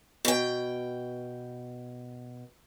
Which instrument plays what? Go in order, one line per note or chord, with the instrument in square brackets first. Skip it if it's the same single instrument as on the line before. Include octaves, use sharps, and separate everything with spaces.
[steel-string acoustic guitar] B2 G5